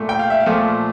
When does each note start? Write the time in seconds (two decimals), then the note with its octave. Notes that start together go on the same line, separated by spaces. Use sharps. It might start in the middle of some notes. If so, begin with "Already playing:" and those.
Already playing: A#2 A3
0.09 G5
0.19 F5
0.30 E5
0.40 F5
0.46 A#2 F3 A3